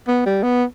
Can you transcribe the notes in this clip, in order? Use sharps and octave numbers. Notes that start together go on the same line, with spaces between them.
B3
G3
B3